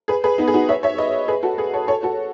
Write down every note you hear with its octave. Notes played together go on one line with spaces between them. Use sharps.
G#4 B4
G#4 B4
B3 D#4
G#4
D#4 F#4
C#5 E5
C#5 E5
B4 D#5
G#4 B4
F#4 A4
G#4 B4
A4 C#5
A4 C#5
F#4 A4